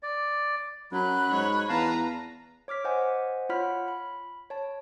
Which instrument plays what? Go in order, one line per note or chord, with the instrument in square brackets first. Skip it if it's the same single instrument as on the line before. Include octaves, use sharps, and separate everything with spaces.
[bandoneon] D5
[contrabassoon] F#2 [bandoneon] F#3 [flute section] B5 F#6
[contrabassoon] G#2 [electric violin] C#5
[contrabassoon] E2 [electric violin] B4 A#5 [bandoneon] F5 A5
[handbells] C#5 D6 F6 B6
C5 D#5 F#5 G#5
F4 C#5 F#5 B5 F6 B6
B5
C#5 A5